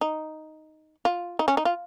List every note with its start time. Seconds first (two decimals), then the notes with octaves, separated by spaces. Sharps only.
0.01 D#4
1.05 F4
1.39 D#4
1.48 C#4
1.57 D#4
1.65 F4